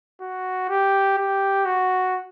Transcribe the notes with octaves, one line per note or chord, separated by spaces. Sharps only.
F#4
G4
G4
F#4